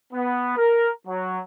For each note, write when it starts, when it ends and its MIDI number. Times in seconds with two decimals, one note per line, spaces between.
0.14 0.56 59
0.58 0.89 70
1.08 1.40 54